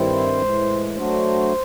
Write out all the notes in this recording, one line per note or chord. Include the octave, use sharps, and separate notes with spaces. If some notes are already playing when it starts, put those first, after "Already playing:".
Already playing: G2 D#3 G3 C4 E4 C5
A2 E3 G#3
F#3 A3 D4 F#4 C5